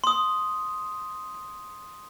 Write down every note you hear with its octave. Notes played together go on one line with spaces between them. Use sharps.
C6 D#6